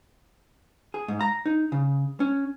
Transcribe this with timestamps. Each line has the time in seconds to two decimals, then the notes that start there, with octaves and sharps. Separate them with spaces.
0.94 G#4
1.08 G#2
1.21 A#5
1.46 D#4
1.72 C#3
2.20 C#4